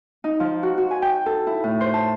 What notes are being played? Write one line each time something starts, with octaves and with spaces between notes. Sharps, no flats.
D#4
F3
F#4
F#4
G#5
G5
A4
E4
A2
C5
A5